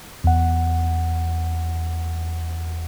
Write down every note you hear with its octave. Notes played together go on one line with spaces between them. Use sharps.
E2 F#5